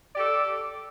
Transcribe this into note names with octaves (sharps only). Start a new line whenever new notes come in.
G4 A4 D5